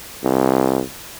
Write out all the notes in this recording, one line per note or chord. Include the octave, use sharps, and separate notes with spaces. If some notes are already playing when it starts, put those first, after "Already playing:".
C2